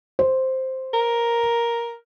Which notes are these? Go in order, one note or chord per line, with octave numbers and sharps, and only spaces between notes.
C5
A#4